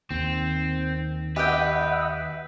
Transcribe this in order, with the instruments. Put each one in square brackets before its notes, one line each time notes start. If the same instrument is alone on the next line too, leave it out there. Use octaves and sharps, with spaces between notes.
[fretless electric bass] D#2 [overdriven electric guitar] C4
[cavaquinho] G4 G5 [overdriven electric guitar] B4 [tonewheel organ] D#5 E5 F#5